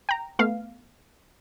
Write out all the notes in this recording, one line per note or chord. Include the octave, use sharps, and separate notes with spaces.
G5 A#5
A3 B3 F5